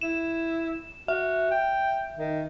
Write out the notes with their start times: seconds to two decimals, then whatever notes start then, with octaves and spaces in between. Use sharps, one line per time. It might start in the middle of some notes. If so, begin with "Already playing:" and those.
0.01 E4 E7
1.08 F#4 E5
1.51 G5
2.17 D#3